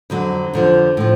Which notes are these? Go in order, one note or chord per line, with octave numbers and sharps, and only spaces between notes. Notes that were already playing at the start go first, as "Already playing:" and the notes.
F2 D3 F#3
F2 D3 F3
A2 F3